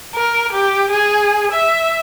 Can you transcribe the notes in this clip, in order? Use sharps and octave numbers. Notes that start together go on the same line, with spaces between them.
A#4
G4
G#4
E5